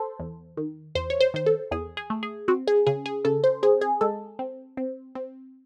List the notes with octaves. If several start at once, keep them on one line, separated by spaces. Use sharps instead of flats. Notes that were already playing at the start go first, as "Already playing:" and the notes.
Already playing: A4 C5
E2
D#3
E2 C5
C#5
C5
D#3 C5
A4
E2 G#4
G#4
A3
G#4
C4 F#4
G#4
C#3 G#4
G#4
C#3 A4
C5
C4 G#4
G#4
G#3 A4
C4
C4
C4